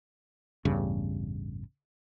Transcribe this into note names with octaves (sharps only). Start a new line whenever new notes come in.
A1 E2 G2 C#3